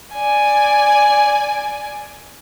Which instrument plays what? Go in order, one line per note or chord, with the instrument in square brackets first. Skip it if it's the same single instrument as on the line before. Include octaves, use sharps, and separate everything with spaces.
[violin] D5 G#5